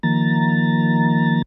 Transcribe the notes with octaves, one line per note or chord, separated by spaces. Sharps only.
D#3 F3 A#3 A#5 A6